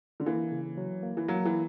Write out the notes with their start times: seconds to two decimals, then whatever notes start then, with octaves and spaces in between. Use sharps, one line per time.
0.20 D3
0.26 E3 A#3
0.52 C#3
0.77 F#3
1.03 A#3
1.17 E3
1.28 F#3 A#3
1.45 E3